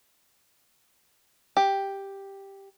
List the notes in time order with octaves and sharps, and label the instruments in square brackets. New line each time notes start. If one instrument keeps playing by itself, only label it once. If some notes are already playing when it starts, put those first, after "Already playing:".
[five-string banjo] G4